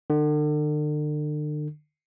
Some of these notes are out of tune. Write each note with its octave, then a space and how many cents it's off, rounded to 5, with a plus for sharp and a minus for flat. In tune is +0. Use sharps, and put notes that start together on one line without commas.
D3 +40